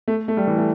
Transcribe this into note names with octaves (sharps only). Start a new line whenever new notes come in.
A3
A3
G3
E3
A3